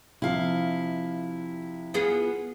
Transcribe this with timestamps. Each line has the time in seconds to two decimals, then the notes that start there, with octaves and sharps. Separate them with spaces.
0.22 C3 F3 E4 F5
1.94 B3 F4 G#4